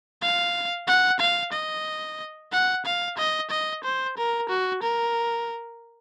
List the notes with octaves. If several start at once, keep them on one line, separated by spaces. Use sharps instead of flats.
F5
F#5
F5
D#5
F#5
F5
D#5
D#5
C5
A#4
F#4
A#4